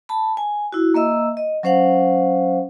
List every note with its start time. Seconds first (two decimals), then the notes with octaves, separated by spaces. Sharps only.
0.09 A5 B5
0.37 G#5
0.72 E4 F#4
0.94 A#3 D#5 E5 E6
1.37 D#5
1.63 F#3 C#4 C5 F5 F#5